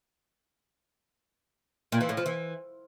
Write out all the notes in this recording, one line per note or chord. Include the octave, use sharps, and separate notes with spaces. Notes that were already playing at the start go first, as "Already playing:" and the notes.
A#2
E3
A2
F3
E3